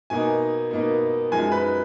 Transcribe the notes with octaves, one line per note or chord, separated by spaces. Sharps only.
B2 A#3 D#4 G#5
B2 A#3 D#4
F#2 F3 G#3 D#4 G#5
B4